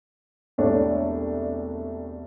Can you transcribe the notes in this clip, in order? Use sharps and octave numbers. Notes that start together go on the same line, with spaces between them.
E1 C2 A3 D4 C#5 D5